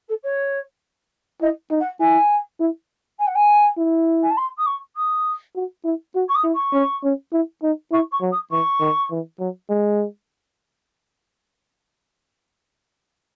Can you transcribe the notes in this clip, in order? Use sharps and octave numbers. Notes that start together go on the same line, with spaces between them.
A4
C#5
E4 D#5
D#4
F#5
E4 G#5
E4
G#5
F#5
G#5
E4
G#5
A5
C6
D#6
C#6
D#6
F#4
E4
F#4
C#6
D#6
E4
C#6
C#4
C#4
E4
D#4
E4 C#6
C#6
F#3
D#6
E3 C#6
D#3
E3
F#3
G#3